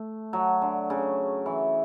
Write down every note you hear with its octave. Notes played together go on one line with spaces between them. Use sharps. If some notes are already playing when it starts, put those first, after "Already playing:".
Already playing: A3
F#3
D3
C#3
E3